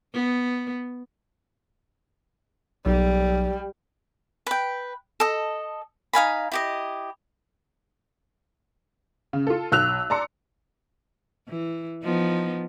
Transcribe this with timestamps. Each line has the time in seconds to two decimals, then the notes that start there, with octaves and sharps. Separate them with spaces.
0.14 B3
2.86 B1 G3
4.47 B4 G5
5.20 A4 D#5
6.13 D#4 F5 G#5 B5
6.52 E4 G4 D#5
9.33 C#3
9.47 F4 A4
9.72 B1 E6 F#6 F7
10.10 D5 A5 A#5 C6 C#7
11.48 E3
12.03 F3 B3 D#4